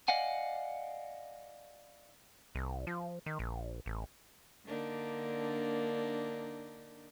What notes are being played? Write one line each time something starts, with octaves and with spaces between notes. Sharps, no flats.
D5 D#5 F5 F#5 G#5
C2
F3
D#3
A#1
A1
D3 A#3 D4 D#4